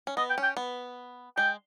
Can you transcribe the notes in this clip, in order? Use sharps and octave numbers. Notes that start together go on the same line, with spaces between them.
C#4
B3 D#5
G5
C#4
G5
B3
G#3 G5